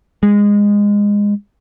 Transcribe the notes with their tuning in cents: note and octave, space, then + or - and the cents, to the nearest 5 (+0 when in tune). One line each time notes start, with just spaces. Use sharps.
G#3 -20